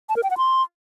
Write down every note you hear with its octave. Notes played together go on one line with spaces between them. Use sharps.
A5
A#4
G5
F#5
C6